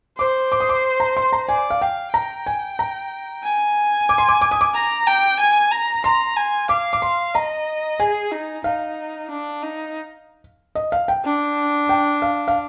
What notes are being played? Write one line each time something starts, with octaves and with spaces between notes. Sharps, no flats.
C5 D6
D6
D#6
D6
A#5
C6
A#5
D5 G#5
F5
F5 G5
G5 A#5
G#5
A#5
G#5
D6
C6
D6
D6
D#6
D6
A#5
G5
G#5
A#5
A#5 C6
G#5
F5 D6
D6
C6
D#5 A#5
G#4 G#5
D#4
D#4 F5
D4
D#4
D#5
F5
G5
D4
G5
F5
F5